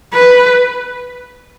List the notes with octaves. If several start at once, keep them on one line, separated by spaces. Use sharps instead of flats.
B4